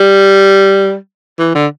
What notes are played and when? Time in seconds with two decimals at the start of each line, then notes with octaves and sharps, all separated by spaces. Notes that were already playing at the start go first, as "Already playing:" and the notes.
Already playing: G3
1.39 E3
1.55 D3